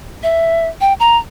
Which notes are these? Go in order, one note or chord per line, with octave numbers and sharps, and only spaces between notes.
E5
G5
A#5